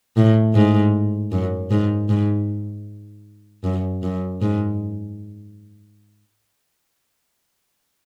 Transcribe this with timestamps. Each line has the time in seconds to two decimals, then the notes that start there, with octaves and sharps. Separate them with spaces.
0.17 A2
0.55 G#2
1.32 F#2
1.71 G#2
2.09 G#2
3.64 F#2
4.03 F#2
4.41 G#2